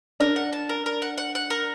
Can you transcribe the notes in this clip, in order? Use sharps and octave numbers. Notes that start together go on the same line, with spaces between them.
D4 A#4
F#5
A5
A#4
A#4
F#5
F#5
F#5
A#4